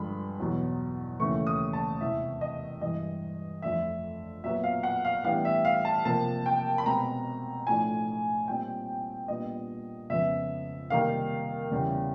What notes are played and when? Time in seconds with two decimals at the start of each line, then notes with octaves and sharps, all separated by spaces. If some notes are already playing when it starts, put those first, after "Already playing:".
Already playing: G2 D3 F3 G#3 B5
0.39 E2 B2 F#3
1.20 D#2 C#3 E3 A3 C#4 C#6
1.47 D#6
1.73 A5
2.01 E2 C3 E3 G#3 E5
2.41 D#5
2.81 G2 E3 G#3 D#5
3.62 F2 D3 F3 A3 D4 E5
4.43 A#2 F#3 B3 E5
4.64 F5
4.83 F#5
5.05 F5
5.24 A2 E3 G3 B3 D4 F5
5.45 E5
5.65 F5
5.85 A5
6.05 C3 F3 A#3 A5
6.46 G5
6.78 B5
6.86 B2 G#3 C4 A#5
7.67 A2 F3 A3 D4 G#5
8.48 A#2 G3 C4 D#4 G5
9.28 A#2 G3 B3 D4 D#5
10.09 F2 C#3 F3 G#3 B3 E5
10.90 C3 D#3 G3 A#3 D#4 F5
11.72 E2 C#3 E3 G3